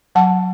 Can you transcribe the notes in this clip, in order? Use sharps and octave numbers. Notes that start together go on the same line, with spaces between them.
F#3 F#5 A5